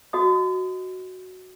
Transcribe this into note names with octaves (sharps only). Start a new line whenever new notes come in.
F#4 D#5 D#6